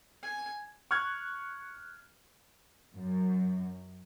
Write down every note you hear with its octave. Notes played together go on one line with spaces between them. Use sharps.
G#5
C#6 F6 F#6 G#6
F#2